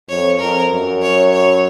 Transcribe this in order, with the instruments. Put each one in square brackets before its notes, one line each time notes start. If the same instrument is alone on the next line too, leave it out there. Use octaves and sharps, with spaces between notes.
[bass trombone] F2 [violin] C#5
[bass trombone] F2 [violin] A#4
[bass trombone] F#2
[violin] C#5
C#5